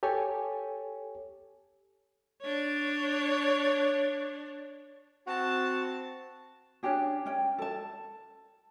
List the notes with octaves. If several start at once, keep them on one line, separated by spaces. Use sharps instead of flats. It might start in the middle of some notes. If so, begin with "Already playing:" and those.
G4 A4 C#5 G#5
D4 C#5
C4 F#4 F#5 A5
C#4 D4 G4 G#4
C#4 G5
A4 A5